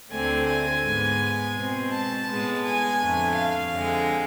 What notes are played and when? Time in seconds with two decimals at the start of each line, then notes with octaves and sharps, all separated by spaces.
0.11 D2 D3 A3 C4 G#5
0.47 G#5
0.83 G#2 G#3 B3
1.55 B2 G#3 C4
1.91 A5
2.27 A2 G#3 B3
2.64 G#5
3.00 F2 D3 A3
3.37 F5
3.72 F2 D3 G#3